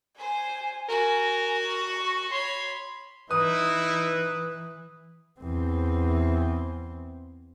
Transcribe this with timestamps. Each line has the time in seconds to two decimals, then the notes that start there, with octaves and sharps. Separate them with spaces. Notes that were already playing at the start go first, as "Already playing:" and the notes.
0.18 C5 G#5
0.89 F#4 A#4 G#5
1.61 C#6
2.32 C#5 B5 C6
3.31 E3 D#4 E4 B4 D#6
5.41 E2 C4